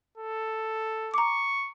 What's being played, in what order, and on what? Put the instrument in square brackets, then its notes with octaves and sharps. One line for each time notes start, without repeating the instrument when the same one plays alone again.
[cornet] A4
[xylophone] A#5 D6 [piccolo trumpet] C#6